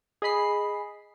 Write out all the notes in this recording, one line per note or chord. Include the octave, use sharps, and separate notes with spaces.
G#4 D#5 B5 C7